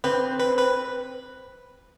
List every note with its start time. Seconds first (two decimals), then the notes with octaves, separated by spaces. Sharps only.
0.04 C4 B4
0.40 B4
0.58 B4